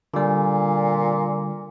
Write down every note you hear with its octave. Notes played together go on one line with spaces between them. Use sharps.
A#2 D3 G3 D5 G#5